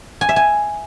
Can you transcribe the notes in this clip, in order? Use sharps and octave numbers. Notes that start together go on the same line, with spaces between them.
G#5
E5
G#5